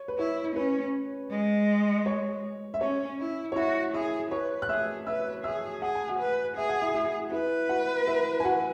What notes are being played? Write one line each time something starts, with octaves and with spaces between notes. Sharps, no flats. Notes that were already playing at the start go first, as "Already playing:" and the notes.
Already playing: C#5
B4
E4 C#5
C#4 B4
G#3
C#5
E5
C#4 C#5
E4
C#5
E4 F#4 E5
E4 G#4 E5
B4 C#5
F#6
G#4 E5 E6
B4 E5 E6
G#4 E5 E6
G#4 F#5
G#5
F#4 F#5
B4
G#4 E5
F#5
E4 E5
E4 E5
E4 B4 E5
F#4 F#5
E4 E5
G#5
F#4 F#5